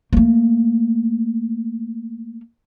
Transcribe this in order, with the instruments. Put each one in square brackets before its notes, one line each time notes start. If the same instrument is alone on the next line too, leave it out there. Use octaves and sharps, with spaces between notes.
[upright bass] A3 A#3